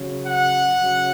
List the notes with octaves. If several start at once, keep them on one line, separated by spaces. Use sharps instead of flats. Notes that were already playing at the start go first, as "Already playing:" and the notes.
Already playing: C#3 F#3
F#5
C#3 F#3